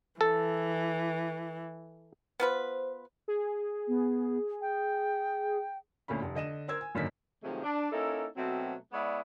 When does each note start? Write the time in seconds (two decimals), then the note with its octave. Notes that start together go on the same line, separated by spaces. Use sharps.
0.21 E3 A4
2.40 B3 F4 B4 C5
3.28 G#4
3.88 B3
4.61 G5
6.08 D2 A#2 A3 C#4 B5
6.22 F1
6.35 D3 D#5 D#7 E7
6.68 A#4 C5 E6 G#6
6.81 G#5
6.95 G#1 F#2 D3 A#3 D#4 B6
7.43 C3 D#3 F3 F#3 G#3 A3
7.63 D4
7.92 A#3 C#4 D#4 E4 A4
8.36 B2 F#3 A3 C4
8.92 G#3 B3 E4 C#5 D5